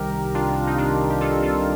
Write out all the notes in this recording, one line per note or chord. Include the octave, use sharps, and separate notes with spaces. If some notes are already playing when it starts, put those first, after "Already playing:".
Already playing: C2 C3 D#3 G4 A#4
D4 F4
D4
D#4
D4 F4
G4
F4 A4
F4 A4